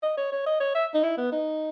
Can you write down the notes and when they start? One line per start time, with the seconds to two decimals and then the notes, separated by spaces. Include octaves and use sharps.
0.03 D#5
0.17 C#5
0.32 C#5
0.46 D#5
0.60 C#5
0.75 E5
0.94 D#4
1.03 E4
1.17 B3
1.32 D#4